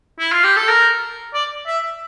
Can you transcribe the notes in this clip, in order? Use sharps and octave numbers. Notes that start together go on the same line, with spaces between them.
E4
F4
G4
A4
A#4
D5
E5